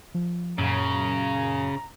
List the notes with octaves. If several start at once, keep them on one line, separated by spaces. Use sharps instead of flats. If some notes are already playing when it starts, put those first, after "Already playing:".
F3
F#2 A#2 C#3 A#5